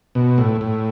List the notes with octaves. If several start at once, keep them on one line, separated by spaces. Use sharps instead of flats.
B2
A2
A2